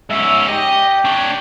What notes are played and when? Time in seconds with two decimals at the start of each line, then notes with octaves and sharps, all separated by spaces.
0.10 G#2 C#4 E5
0.48 G4 D#5
1.05 D4 C#5